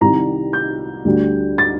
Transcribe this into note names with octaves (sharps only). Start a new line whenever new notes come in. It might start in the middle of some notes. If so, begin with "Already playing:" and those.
C2 C3 D#3 G3 A#5
G6
D2 D3 G3 D4
A6